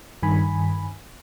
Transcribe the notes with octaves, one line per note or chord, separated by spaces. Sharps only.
G2 D#3 G#5 B5